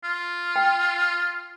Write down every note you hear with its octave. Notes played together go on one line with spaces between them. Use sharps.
F4
G5